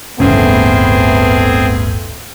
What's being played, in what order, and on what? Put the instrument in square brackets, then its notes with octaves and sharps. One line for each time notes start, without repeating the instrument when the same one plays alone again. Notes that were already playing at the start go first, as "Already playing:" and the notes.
[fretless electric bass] D1 G1 E3 [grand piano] C#3 [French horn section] A3 B3 [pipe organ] C4 G#4